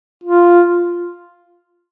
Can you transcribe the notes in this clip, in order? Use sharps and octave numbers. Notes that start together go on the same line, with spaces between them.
F4